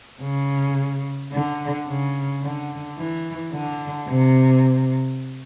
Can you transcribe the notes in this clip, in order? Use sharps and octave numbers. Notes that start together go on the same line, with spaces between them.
C#3
D3
C#3
D3
E3
D3
C3